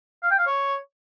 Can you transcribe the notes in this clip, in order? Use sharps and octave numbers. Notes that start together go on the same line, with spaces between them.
F5
G5
F5
C#5